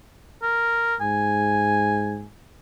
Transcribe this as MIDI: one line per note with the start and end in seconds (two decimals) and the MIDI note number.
0.43 0.96 70
1.01 2.28 44
1.01 2.27 80